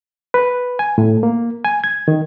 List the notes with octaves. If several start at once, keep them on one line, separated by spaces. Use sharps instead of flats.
B4
G#5
A2
A#3
G#5
G#6
D#3